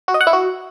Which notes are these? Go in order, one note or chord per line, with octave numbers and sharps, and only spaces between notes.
F#4
D#5
F#5
E4
F#4